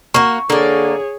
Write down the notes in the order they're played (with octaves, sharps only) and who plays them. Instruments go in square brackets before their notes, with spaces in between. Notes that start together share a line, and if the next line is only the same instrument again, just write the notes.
[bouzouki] A#3 F#4 [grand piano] C#6
[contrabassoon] D3 [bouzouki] A#3 D5 [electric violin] G#4 C#5